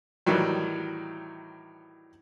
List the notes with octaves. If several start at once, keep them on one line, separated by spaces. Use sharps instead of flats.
A2 D#3 E3 F#3 G3